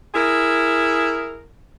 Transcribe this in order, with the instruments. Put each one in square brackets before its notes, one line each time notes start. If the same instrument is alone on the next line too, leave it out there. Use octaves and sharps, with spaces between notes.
[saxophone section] E4 G#4 A#4